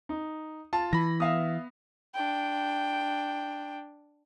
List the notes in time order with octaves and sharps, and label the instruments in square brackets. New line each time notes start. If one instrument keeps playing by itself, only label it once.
[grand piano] D#4
[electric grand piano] F4 [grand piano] A5
[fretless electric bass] E3 [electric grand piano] B5 A#6
[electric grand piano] B3 [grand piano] E5 F5 D#6
[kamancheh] D4 G5